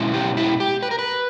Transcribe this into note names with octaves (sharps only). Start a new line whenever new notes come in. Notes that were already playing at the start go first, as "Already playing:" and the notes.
Already playing: B2 G#3 C#4 E4
G4
E4
G4
B4
A#4
B4